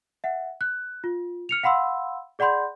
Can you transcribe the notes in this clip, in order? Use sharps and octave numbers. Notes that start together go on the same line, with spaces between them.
E5 F#5
F#6
F4
F6 C#7 F7
F5 F#5 B5 C6 E6
G#4 D5 F#5 B5 C6 G6